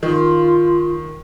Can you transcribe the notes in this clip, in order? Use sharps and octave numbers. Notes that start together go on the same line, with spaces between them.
D#3 F4